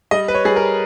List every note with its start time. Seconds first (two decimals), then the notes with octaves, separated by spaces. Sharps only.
0.11 G3 D#5
0.28 B4
0.35 C#5
0.45 G3 G#4
0.56 A#4